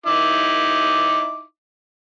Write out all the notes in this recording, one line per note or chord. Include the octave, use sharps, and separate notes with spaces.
D#4 E4 D6